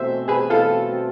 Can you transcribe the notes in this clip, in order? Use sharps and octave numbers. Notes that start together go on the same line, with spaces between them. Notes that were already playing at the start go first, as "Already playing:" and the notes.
Already playing: B2 A3 C4 C5 E5
G#4 B4
F4 A4